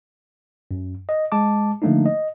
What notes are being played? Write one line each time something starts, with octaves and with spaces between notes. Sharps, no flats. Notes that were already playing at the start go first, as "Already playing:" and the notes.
F#2
D#5
G#3 A5 D6
D3 F3 A3 A#3 D4 D#4
D#5